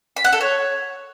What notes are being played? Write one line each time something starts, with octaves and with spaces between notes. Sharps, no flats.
B5
F#5
A4
C#5